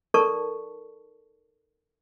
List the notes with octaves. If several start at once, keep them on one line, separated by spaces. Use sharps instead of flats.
D#4 A4 A#4 D5 A5 C#6